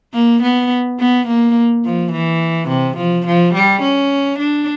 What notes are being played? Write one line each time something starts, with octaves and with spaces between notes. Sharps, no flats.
A#3
B3
B3
A#3
F3
E3
C3
F3
F3
G3
C#4
D4